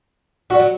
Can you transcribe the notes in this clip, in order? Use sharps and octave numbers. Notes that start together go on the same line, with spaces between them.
G3 F#4
F#3